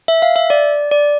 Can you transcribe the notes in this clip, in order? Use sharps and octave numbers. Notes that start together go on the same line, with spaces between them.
E5
F5
E5
D5
D5